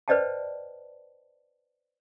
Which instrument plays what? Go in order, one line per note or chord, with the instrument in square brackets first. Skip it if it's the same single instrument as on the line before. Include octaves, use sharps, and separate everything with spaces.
[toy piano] B4 C5 D5 D#5 G5 A5